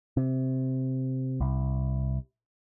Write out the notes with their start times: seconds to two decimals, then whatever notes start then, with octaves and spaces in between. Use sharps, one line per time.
0.17 C3
1.40 C2